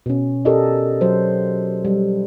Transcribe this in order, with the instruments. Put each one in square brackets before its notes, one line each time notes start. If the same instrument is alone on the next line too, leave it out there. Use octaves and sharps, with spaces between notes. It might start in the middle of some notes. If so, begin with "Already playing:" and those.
[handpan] B2 C#4
G4 A4 A#4 D5 D#5
F#3 C5
G3